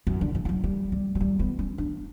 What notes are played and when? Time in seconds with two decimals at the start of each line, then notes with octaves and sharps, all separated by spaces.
0.07 F#2
0.21 D3
0.35 E3
0.45 E3
0.49 F#3
0.64 G3
0.92 G3
1.15 F#3
1.20 G3
1.39 B3
1.59 C#4
1.78 D4